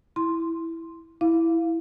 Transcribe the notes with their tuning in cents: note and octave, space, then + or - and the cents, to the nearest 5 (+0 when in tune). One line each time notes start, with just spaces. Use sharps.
E4 +0 C6 +0
E4 +0 F5 +0